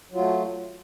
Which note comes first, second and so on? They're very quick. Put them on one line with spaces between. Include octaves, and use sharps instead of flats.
F#3 F4 A3